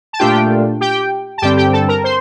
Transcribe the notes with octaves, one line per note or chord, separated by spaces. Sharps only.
A5
A#2 A3 D4 F4 G4 G5
G4 G5
A5
G2 D3 G3 C4 G4 G5
G4 G5
A4 A5
A#4 A#5
C5 C6